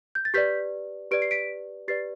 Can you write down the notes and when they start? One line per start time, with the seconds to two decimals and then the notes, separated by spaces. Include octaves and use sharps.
0.15 G6
0.25 A6
0.34 G4 B4 D5 G6 B6
1.11 G4 B4 D5 D7
1.22 C7
1.31 B6 D7
1.88 G4 B4 D5 A6 C7